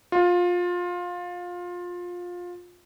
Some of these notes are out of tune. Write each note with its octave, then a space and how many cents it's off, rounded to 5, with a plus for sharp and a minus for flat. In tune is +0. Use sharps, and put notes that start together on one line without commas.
F4 +20